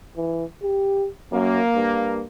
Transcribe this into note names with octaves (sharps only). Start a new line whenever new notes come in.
E3
G4
F#2 A#3
G2